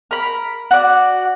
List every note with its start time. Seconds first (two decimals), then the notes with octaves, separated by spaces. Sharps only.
0.11 A#4 B5
0.71 F#4 D5